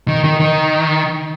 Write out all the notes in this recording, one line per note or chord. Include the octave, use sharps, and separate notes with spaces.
D#3
D#3
D#3